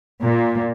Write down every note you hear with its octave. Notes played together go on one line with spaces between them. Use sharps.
A#2